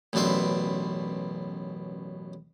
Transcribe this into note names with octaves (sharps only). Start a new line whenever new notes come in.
A1 F#2 B2 D4 E5 C6